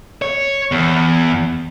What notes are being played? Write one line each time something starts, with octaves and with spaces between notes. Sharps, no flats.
C#5
E2